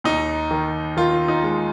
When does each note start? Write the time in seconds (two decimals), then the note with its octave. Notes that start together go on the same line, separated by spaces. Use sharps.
0.04 D#2 D#4
0.51 D#3
0.97 D#3 F4
1.28 D#4
1.43 G#3